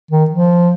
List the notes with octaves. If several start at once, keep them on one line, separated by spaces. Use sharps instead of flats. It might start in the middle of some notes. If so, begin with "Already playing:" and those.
D#3
F3